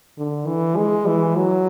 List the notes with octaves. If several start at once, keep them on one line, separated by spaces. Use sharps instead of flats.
D3
E3
G#3
E3
F#3